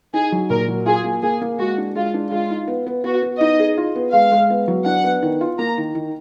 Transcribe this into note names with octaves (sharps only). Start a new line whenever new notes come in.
D#4 G#4
F#3
A#2 A#4
F#3
F4 G#4
A#3
A#3 G#4
A#3
G#3 F#4
D4
G#3 F4
D4
G#3 F4
D#4
B3
B3
B3 F#4
B3
D#4 D#5
G#4
F4
B3
G#3 F5
G#3
B3
F#3
D4 F#5
B3
D#3
F4
A#3 A#5
D#3
D#3